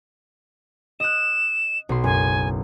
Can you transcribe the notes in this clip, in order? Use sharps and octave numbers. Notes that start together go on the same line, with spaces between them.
D#5 F#6 E7
B1 C6
F#1 G#5